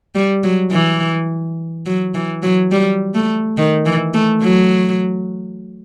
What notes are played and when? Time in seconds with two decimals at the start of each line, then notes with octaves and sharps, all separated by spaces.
0.15 G3
0.44 F#3
0.72 E3
1.86 F#3
2.14 E3
2.43 F#3
2.72 G3
3.14 A3
3.57 D#3
3.86 E3
4.14 A3
4.42 F#3